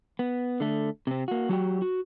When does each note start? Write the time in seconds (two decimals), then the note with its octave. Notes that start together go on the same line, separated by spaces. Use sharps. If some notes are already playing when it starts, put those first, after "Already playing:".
0.19 B3
0.60 D3 A3
1.07 C3 C4
1.28 A#3 F#4
1.49 F#3 F#4 G4 G5
1.82 F#4